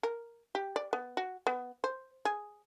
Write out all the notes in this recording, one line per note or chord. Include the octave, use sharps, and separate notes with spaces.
A#4
G4
D5
B3
F#4
B3
C5
G#4